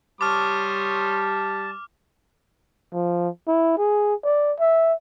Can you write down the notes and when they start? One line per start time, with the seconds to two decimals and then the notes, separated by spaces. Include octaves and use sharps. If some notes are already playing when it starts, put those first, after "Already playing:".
0.21 G3 C#5 A5 C6 D6 D#6 F6
2.93 F3
3.48 E4
3.78 G#4
4.24 D5
4.59 E5